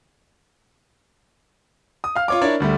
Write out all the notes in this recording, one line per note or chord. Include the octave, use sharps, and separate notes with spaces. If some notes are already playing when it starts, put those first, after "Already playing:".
D#6
F5 F6
F4 C#5 D6
D4 E4 A#4 C#5 D5
D2 G3 A3